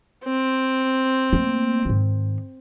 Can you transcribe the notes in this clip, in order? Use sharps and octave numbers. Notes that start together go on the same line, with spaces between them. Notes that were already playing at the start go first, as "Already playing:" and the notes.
C4
A3 A#3
G#2 D#3